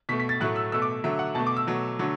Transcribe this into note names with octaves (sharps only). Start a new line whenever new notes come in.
B2 A3 B6
B6
A6
A2 F#3 A3 F#6
E6
B2 A3 E6
D6
D3 F#3 A3 E5
F#5
B2 A3 A5
D6
E6
B2 F#3 A3
D3 F#3 A3